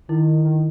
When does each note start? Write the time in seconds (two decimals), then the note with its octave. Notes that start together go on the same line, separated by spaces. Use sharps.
0.08 D#3 E4
0.45 D#3